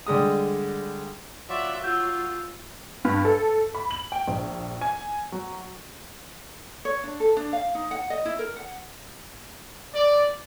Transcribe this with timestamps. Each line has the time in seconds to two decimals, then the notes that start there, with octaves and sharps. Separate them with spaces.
0.07 D3 G3 G#3 D#6
1.50 F#3 F4 F#4 D5 E5
1.84 F4 F#4 E6 G6
3.05 G2
3.25 A4
3.75 B5
3.91 F#7
4.12 G5
4.28 A#1
4.81 G#5
5.32 F#3
6.85 C#5
7.04 D4
7.20 A4
7.37 D4
7.53 F5
7.75 D#4
7.91 F#5
8.10 D#5
8.25 E4
8.39 A#4
8.56 F#5
9.95 D5